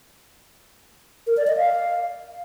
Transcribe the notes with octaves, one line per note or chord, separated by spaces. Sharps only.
A#4
D5
D#5
F5